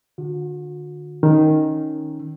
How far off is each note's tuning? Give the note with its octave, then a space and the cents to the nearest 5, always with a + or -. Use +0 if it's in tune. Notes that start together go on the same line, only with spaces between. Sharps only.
D3 +25 F#4 -45
D#3 +0 C#4 +0